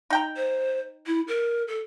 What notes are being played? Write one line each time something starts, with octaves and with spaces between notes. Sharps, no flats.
D#4 G5 A#5
C5
E4
A#4
A4